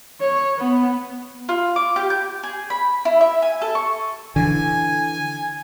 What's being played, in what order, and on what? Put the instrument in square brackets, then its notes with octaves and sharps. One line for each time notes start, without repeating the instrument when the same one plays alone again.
[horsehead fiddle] C#5
B3
[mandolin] F4
D6
G4
G6
G#4
B5
E4
E5
G#5
A4
C#6
[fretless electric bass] D3 E3 [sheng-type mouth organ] G#5